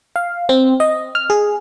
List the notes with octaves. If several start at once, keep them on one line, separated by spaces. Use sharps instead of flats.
F5
C4
D#5
F6
G#4